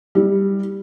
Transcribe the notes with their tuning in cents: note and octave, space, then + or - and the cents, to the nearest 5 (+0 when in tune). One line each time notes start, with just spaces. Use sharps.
G3 +5 E4 -25